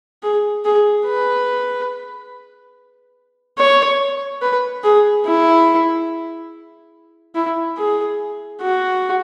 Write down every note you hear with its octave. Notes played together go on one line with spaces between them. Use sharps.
G#4
G#4
B4
C#5
B4
G#4
E4
E4
G#4
F#4